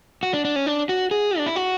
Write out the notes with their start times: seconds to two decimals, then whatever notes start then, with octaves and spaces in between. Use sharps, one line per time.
0.23 F#4
0.34 D4
0.45 D4
0.56 C#4
0.66 D4
0.89 F#4
1.11 G#4
1.38 D4
1.46 E4
1.56 F#4